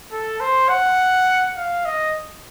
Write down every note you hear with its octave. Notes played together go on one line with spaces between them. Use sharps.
A4
C5
F#5
F5
D#5